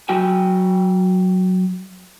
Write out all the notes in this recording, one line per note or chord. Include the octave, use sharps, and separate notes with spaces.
F#3 F#4 G5 G#5